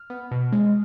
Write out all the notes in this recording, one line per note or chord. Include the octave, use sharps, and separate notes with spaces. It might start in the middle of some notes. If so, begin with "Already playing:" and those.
Already playing: F6
B3
B2
G#3